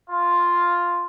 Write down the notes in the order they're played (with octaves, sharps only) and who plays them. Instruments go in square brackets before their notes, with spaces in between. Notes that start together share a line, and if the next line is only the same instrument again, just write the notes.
[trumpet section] F4